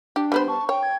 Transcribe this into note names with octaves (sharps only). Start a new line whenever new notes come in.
D4 G4
G3 B3 C5 B5
A5 C#6
C#5 G5
G#6